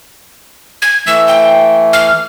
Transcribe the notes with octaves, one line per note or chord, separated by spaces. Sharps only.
G#6
E3 A3 E6
G5
F6